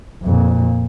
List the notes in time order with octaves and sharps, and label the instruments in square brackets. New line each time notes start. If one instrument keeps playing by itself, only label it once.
[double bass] F2 A#2